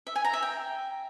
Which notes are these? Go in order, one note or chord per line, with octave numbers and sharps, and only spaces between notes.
E5
G#5
A#5
E5
G5